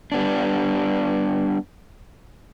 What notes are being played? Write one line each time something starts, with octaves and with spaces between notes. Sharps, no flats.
G3 B3 D4